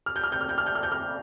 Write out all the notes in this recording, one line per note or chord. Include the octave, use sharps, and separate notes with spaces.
F6
G6
F6
G6
F6
G6
F6
G6
F6
G6
F6